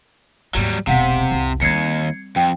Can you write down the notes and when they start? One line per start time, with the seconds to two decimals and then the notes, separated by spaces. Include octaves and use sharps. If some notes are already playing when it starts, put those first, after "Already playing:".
0.55 D#2 G#2 F#3 G3
0.87 E1 B1 C3 F5 F#5 B6
1.31 C2 F2
1.61 D#2 G3 C4 G#6 C7 C#7
2.36 F2 G5